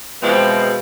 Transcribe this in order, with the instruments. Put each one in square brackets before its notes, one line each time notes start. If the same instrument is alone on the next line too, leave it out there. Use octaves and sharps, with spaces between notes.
[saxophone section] B2 G#3 [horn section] E3 F3 C4